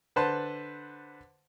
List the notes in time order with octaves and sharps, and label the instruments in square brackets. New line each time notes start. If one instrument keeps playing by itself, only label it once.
[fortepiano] D3 B4 C5 A5 C6